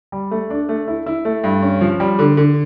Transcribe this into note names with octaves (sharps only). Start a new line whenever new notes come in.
G3
A3
D4
A3
E4
E4
A3
G2
C#4
F3
G3
D3
D3